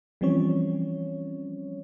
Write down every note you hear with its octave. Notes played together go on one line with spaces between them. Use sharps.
E3 F3 G3 C4 C#4 C#5